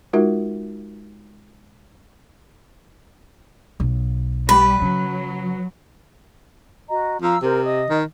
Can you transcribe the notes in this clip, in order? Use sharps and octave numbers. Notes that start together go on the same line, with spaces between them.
G#3 D#4 F4 F#4 A#4 E5
B1
G3 B4
C#3 F#3
F#4 D#5 A#5
F3 F5 A#5 E6
C3 A#4 C5
D#5 D#6
D#3